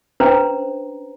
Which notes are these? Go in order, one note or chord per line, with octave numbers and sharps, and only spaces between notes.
C#4 D4 B4 C5 A#5